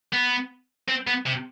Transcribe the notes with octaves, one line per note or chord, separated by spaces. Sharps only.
B3
C4
B3
C3